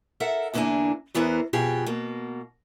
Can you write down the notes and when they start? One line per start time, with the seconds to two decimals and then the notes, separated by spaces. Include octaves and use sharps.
0.20 A4 A#4 E5 F#5
0.54 E2 D3 A#3 D4 E4 G#5
1.14 E2 E3 B3 A#4 C5
1.53 F2 B2 F3 G4 G#4
1.86 B2 A#3